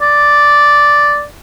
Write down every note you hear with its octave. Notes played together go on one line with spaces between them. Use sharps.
D5